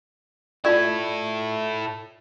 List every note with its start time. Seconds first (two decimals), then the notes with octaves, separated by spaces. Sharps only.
0.65 E4 F4 A4 D5